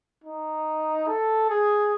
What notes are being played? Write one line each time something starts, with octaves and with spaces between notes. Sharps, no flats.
D#4
A4
G#4